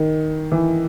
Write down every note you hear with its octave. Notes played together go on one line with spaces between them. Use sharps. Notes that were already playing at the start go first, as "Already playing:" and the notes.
Already playing: D#3
E3